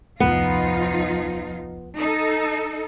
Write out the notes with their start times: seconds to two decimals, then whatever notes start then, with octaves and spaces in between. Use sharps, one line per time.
0.20 D1 C2 F2 F3 B3 D#4 F4
1.97 D#4 A4